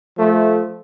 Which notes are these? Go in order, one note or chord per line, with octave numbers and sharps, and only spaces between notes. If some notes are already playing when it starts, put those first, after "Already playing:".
F3 A3